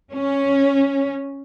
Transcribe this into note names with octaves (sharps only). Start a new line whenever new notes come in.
C#4